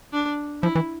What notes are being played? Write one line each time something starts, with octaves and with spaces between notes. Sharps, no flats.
D4
F3 E4
E3